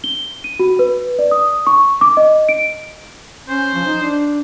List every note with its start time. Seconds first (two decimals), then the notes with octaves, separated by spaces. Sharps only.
0.04 G7
0.44 D#7
0.60 F#4
0.79 B4
1.19 D5
1.31 D#6
1.67 C#6
2.01 D6
2.17 D#5
2.49 D7
3.48 C#4 C5
3.75 F3
3.86 D#4
4.02 D4